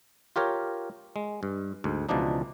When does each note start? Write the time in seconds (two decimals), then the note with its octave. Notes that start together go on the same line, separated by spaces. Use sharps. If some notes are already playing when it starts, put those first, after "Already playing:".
0.36 F4 G4 A#4 C#5
1.16 G#3
1.43 G2
1.84 D2 G#2
2.09 C#2 B2 E3 F3 D4 D#4